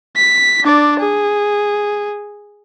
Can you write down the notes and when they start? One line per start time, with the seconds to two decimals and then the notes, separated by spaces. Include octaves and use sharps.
0.17 B6
0.63 D4 D5
1.00 G#4